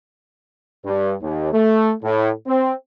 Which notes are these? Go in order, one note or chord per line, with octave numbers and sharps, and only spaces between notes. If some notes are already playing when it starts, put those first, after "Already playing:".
G2
D#2
A3
A2
C4